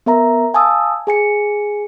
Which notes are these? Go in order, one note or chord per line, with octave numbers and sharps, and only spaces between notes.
B3 A#4 E5 A#5
F5 G#5 A5 D#6 E6
G#4 G#5 C#7